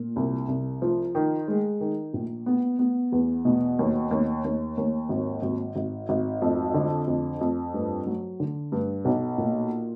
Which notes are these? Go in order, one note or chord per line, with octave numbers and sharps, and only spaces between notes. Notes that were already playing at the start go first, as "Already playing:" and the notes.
Already playing: A#2
C2
C2
F3
D#3
G#3
D#3
A#1
B3
B3
E2
B2
D#2
D#2
D#2
D#2
G#1
G#1
G#1
G#1
F2
D3
F2
F2
G2
F#3
D3
G2
B1
A#2